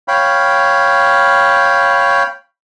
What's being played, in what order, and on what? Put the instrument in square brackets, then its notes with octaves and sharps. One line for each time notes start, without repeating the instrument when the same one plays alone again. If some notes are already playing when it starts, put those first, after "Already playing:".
[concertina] C#5 F5 G5 B5